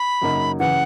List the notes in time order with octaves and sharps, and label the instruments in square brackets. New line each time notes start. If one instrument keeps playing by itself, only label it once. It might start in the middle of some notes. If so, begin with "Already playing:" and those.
Already playing: [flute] B5
[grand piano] F#2 C#3 F#3 A#3 D#4
[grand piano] C#3 E3 [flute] F#5